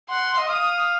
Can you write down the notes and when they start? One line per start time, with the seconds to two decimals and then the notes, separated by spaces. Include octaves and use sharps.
0.10 F#5 C6
0.38 D#5
0.49 F5 D#6